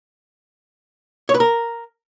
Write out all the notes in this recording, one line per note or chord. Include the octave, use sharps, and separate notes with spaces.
C#5
B4
A#4